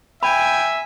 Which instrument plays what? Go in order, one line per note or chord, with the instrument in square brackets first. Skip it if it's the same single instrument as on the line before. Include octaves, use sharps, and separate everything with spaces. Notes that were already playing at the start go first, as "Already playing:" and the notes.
[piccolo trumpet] E5 [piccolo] G5 [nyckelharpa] G#5 [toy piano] B5